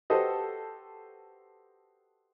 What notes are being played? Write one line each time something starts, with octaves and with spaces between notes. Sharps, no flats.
F#4 G4 A4 B4 C5 D#5